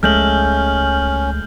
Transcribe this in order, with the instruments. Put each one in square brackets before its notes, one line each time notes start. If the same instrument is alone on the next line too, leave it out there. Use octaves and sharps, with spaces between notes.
[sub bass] C#2 [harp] G#3 A3 [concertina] C#4 [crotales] F6 G6 F#7